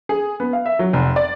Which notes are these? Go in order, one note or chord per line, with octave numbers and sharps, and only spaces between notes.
G#4
B3
F5
E5
F#3
F1
D5